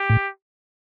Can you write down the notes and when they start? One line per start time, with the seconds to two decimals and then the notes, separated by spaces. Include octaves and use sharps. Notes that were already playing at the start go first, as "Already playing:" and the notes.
Already playing: G4
0.10 A2